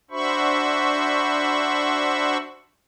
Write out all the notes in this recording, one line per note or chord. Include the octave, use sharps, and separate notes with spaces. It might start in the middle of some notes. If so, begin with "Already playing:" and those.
D4 F#4 C5 E5 B5 C#6